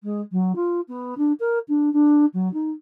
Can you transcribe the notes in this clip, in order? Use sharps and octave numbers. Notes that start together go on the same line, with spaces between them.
G#3
F#3
F4
B3
D4
A#4
D4
D4
F#3
D#4